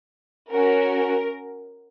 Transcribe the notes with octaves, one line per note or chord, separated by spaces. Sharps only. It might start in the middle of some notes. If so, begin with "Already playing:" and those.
C#4 F#4 A#4